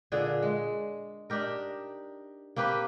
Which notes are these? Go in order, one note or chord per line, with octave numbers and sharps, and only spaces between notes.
A#2 D3 D4 G#4
G#3
D4 D#4 G4 A#4
A#3 C4 G4 B4